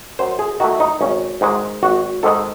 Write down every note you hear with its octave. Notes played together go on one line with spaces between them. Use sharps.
F#2 C5
G#4
D#3 A3 F#4
D#4
G#1 C#4
G#2 D#3 G#3
G#1 F#4
G#2 D#3 G#3 A4